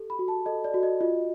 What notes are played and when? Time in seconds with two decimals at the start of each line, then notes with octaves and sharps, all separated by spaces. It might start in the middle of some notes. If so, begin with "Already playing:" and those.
Already playing: G4 A4
0.10 B5
0.19 F#4
0.28 A5
0.46 A4 D#5
0.64 D5
0.74 F#4
0.83 D#5
1.01 F4 D#5